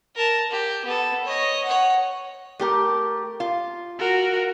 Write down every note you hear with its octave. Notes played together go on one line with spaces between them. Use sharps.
A#4 A5
G4
B3 A4
C#5 D#5
C#5 F#5
A3 G4 A#4
F4
F#4 A#4